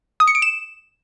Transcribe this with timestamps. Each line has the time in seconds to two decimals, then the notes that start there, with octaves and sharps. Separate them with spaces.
0.20 D#6
0.28 C#7
0.35 D7
0.42 E7